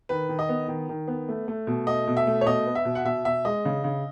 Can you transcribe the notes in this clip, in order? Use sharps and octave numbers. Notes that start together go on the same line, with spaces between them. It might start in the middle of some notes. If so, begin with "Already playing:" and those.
D#3 B4
D#3
D#5
B3
D#3
D#3
B3
A3
A3
B2
A3 D#5
B2
E5
A3
C#5
B2 D#5
B3
E5
B2
F#5
B2 E5
B2 E5
G#3 D#5
C#3
C#3